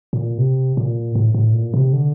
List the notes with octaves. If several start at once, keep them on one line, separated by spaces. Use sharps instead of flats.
A#2
C3
A#2
A2
A2
A#2
C3
D3